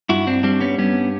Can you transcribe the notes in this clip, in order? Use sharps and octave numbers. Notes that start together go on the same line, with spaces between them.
G2 E4 F#4
C4 D4
G3 C4 D4
B3 C#4
G2 B3 C#4